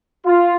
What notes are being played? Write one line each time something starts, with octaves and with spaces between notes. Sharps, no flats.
F4